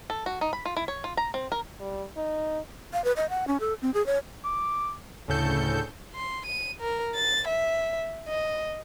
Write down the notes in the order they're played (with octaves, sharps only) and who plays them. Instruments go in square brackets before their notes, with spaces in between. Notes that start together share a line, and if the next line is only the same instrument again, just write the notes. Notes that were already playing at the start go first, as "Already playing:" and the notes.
[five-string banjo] A4
F#4
D#4
B5
F4
E4
C#5
F4
A#5
C4
A#4
[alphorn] G3
D#4
[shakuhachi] F5
B4
D#5
F#5
C#4
A4
C4
G#4
C#5
[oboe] D6
[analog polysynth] D2 A2 C#3 A4 G6 C#7
[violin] C6
D#7
A#4
A6
E5
D#5